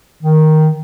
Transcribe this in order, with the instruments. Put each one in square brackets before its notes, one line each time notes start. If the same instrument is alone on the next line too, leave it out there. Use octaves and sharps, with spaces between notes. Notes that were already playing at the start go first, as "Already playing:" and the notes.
[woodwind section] D#3